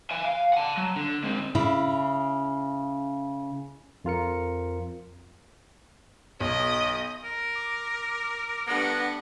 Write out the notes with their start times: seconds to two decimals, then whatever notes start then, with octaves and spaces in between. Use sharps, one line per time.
0.11 E5 G#5
0.25 F5
0.53 F#5 A5
0.77 F#3
0.96 D3
1.24 G#3 C4
1.55 C#3 E4
4.05 F2 F4 A#4 C#7
6.40 B1 D#5
7.24 A#4
7.55 D6
8.67 G3 A3 B3 D4 F#5 A#6